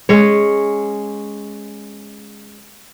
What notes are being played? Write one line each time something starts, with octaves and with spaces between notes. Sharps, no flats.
G#3 C#4 C#5